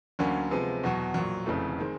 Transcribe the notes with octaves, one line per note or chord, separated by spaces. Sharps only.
D2 D3 F#3 A#3 C#4
C3 F3 G#3 B3
E2 B2 F#3
A#1 A#2 F#3
F1 F2 C#3 E3 A3
D#3 G#3 C4